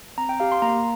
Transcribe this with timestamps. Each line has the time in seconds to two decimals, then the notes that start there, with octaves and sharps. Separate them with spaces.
0.18 C4 A#5
0.29 G5
0.40 G4 F5
0.52 C6
0.62 A#3 A#5